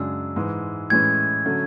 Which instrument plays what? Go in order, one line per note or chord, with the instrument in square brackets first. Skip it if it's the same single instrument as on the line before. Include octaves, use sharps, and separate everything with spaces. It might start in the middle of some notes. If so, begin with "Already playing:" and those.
Already playing: [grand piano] F#2 C#3 G#3 D4 [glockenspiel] E6
[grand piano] G#2 E3 G#3
[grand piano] A2 E3 G#3 C#4 [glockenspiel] G#6
[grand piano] D3 F#3 A3 C#4